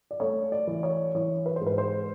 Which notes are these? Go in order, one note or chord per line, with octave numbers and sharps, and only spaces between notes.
D5
A3 C#5
D5
E3
C#5
E3 C#5
B4
G#2 C5
B4
C5